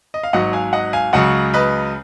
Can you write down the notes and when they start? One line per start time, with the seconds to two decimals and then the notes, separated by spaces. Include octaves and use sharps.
0.14 D#5
0.23 F5
0.33 G#1 G#2 F#3 D#5 F#5
0.53 F5 G#5
0.73 D#5 F#5
0.93 F5 G#5
1.13 C#2 C#3 F#3 D#5 F#5
1.54 B4 D#5